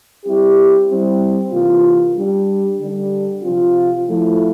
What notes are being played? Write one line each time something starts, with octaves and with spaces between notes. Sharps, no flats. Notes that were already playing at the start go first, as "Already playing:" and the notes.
G3 C4 E4 G4
G3 C4 E4
C3 E3 A#3 F4
G3 D4 G4
D3 G3 D4
C3 F3 C4 F4
F3 A3 E4